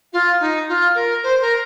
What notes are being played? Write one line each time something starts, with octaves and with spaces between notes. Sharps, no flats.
F4
D#4
F4
A#4
C5
A#4